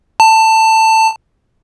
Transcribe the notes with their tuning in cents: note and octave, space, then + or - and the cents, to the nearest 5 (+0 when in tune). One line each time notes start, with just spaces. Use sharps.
A5 +15